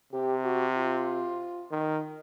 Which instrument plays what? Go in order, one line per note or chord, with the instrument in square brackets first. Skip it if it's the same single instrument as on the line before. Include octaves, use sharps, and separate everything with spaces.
[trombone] C3 [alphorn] G4
[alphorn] F#4
F4
[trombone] D#3